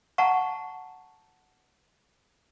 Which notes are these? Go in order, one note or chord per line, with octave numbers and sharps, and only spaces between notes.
F#5 A5 A#5 C#6